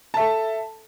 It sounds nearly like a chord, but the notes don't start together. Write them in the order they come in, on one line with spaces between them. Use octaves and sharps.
A5 E5 A4